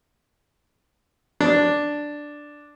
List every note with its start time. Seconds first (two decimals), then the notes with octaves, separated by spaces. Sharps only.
1.41 D4